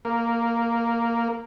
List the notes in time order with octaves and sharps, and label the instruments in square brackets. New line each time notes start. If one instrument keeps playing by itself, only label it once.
[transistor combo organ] A#3